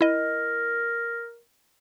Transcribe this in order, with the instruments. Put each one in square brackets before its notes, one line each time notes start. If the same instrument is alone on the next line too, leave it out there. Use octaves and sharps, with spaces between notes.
[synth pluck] E4 D#5 [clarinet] A#4